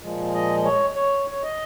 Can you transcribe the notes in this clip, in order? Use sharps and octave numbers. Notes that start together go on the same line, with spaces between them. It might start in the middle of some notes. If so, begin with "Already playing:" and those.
A#2 F3 G#3
D#5
C#5
C#5
C#5
D#5